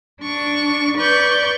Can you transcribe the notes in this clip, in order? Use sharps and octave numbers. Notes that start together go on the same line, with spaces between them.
D4 C#6
B4 D5 C#6 G6